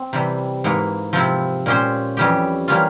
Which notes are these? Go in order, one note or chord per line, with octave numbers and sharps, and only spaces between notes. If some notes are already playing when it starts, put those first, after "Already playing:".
Already playing: C4
C3 E3 G3
G#2 E3 A#3
C3 F3 C4 E4
A#2 G#3 C#4 G4 C5
F2 E3 G3 C#4 G4
E3 G3 A#3 C#4 F4